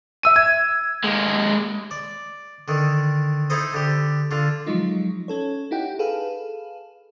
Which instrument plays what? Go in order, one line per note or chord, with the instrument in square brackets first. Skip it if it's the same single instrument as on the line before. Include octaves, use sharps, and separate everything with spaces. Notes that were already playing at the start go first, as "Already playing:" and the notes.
[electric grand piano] E5 E6 D#7
G#6
[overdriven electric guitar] G#3 A#3
[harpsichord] D5
D3 D#3
D#4 E4 A4 C5 D#5
D3 G4
D3 F4
[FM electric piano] F3 F#3 G#3 D#4 F4
C#4 A4 C#5
D#4 E4 G4 F#5 G5
G#4 A4 B4 F5